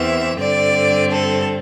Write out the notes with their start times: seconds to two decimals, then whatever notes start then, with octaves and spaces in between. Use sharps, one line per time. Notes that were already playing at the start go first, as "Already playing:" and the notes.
Already playing: E2 E3 C4 E5
0.40 G2 D3 C4 D5
1.11 A4